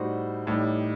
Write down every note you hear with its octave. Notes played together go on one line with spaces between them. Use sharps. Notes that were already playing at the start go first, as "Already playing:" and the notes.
Already playing: A2 G3 D#4 F#4 C5
A1 A2 G3 D#4